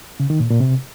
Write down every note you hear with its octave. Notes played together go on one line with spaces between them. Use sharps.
C#3
D#3
A#2
A#2
C3